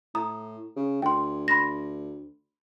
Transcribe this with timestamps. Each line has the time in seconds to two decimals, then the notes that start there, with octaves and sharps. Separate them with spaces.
0.15 A2 A#5 D#6
0.76 C#3
1.02 D2 G5 C6
1.48 B5 C6 A#6